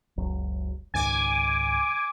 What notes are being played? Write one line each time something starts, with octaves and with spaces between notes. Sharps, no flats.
F#1 C#2 F#3
C#2 G#2 D#3 G#5 D6